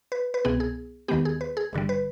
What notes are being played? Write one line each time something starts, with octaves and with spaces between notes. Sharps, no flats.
B4
B4
C2 B2 B3 G#4
G#4
D#2 D#3 G#3 B3 G4
G#4
B4
G#4
G1 G2 D3 G3
B4